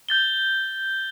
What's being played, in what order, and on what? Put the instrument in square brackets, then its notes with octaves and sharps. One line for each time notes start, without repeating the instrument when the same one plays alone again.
[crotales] G6 A6 G7